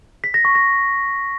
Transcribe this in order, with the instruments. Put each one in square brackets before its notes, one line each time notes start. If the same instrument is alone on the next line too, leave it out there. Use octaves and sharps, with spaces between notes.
[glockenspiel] B6
A#6
C#6
A#6